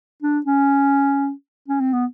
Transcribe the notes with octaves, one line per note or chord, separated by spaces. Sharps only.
D4
C#4
C#4
C4
B3